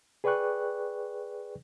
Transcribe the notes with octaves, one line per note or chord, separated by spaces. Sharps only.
G#4 B4 D5 G5 C#6 F#6